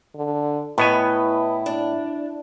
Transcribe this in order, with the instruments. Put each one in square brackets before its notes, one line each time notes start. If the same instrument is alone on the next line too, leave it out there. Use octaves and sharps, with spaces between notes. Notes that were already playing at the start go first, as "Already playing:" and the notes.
[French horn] D3
[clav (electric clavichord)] A2 B3 G#5 [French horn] E4 [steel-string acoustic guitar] B4 D#5
[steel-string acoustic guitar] D4